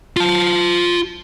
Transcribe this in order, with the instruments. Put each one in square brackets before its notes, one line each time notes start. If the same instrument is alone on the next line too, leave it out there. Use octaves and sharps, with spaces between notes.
[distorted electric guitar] F4 A5